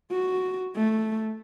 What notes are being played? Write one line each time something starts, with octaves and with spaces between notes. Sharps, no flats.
F#4
A3